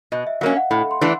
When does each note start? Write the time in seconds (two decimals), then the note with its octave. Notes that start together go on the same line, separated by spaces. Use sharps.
0.12 B2 D#5
0.27 E5
0.41 F#3 A#3 C#4 F5
0.57 F#5
0.71 A2 B5
0.91 C6
1.01 E3 A3 D4